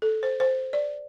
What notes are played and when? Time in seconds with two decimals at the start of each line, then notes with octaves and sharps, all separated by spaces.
0.02 A4
0.23 C5
0.40 C5
0.73 D5